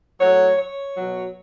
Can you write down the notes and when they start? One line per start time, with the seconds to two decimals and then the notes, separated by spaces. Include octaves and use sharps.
0.20 A2 F#3 C#5
0.58 C#5
0.95 B2 F#3